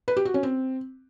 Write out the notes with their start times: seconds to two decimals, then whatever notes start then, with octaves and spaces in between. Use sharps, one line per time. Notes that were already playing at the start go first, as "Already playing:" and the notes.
0.08 B4
0.17 G4
0.25 F#4
0.34 C#4
0.43 C4